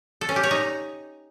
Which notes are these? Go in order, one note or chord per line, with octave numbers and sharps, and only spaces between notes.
A4
C#4
G4
C#5
D#4